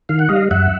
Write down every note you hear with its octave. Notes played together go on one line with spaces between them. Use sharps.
D#3 F5
F#5
G3 D#5 F5
F#2 E5 F#5